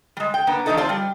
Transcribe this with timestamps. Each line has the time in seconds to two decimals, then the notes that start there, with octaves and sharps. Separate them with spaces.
0.17 G3 G#3
0.34 G5
0.47 A#3 B3 D4
0.66 E3 F3 A3 D4 D#4 A4
0.77 C4 F4 C5 D5 A5
0.89 G3